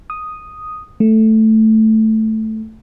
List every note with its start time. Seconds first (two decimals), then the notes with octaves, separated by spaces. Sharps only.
0.10 D#6
1.00 A3